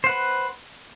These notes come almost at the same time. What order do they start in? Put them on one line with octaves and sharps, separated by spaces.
C5 F#5 B4